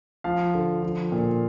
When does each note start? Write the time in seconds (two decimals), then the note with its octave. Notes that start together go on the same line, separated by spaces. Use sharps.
0.24 F3 F5
0.54 D3
0.83 F3
1.12 A#2